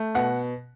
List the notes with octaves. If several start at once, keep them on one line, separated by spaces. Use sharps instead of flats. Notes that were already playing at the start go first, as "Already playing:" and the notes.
Already playing: A3
B2 F#5